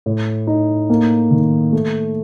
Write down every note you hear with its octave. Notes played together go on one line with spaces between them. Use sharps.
A2
D#4
A#3
D#3
A3